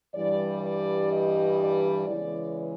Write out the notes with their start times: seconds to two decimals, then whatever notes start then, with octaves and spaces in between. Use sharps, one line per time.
0.14 G2 E3 G3 D5
0.63 D5
1.12 D#5
1.59 D5
2.07 C#3 E3 G#3 B3 D5